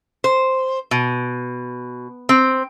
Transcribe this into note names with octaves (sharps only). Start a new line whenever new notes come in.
C5
B2
C4